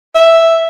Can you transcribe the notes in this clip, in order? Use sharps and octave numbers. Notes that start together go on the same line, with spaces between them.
E5